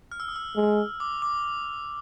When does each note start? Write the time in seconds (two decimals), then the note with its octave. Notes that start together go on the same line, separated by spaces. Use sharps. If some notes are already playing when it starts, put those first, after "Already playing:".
0.12 F6
0.20 E6
0.28 D#6
0.36 E6
0.56 G#3
1.00 D6
1.22 D6